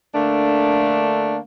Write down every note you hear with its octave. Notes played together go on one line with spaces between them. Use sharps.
D3 A3 A#3 D4